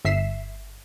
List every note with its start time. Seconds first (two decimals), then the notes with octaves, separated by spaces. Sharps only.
0.05 G1 E5 B6 C7 E7